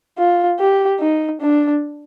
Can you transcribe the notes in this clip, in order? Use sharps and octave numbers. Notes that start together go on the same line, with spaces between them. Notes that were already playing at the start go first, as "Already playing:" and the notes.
F4
G4
D#4
D4